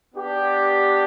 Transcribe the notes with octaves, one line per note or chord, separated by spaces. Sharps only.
B3 D4 G4